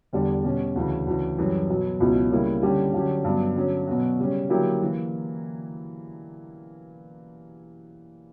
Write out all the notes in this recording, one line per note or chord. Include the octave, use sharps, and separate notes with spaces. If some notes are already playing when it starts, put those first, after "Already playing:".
E2 D3 G3
B2 G3 C#4 F#4
D2 C#3 E3
D2 C#3 E3
F#2 E3 G3
B2 F#3 B3
C#2 B2 F#3 B3 E4
C#3 G3 A#3 E4
D3 G3 C#4 G4
D3 F#3 C#4 G4
G2 F#3 B3
D3 F#3 C#4
B2 F#3 B3 F#4
C#3 G3 C#4
D3 F#3 A#3 E4 G4
E3 A#3